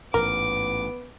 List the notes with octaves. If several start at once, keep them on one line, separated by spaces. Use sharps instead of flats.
A1 G#2 B3 A#4 D6